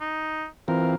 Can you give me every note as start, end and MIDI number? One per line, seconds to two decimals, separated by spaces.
0.01 0.45 63
0.68 0.95 52
0.68 0.95 60
0.68 0.95 65
0.68 0.95 70